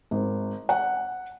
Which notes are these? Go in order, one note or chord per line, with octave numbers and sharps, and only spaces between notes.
G#1
F#5